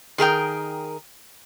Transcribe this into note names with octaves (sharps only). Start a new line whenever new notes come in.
D#3 G#4 A#4 G5